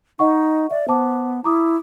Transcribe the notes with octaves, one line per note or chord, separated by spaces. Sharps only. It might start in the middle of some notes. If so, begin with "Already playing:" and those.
D#4 D#5 F#5 C#6
D5 E5
B3 C5 A5 D6
E4 A#5 D6 D#6